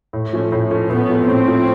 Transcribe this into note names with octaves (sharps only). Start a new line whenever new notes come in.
A2
F3 A3 C#4
A2
F3 A3 C#4
A2 B3
F3 A3 C#4
A2 C4
F3 A3 C#4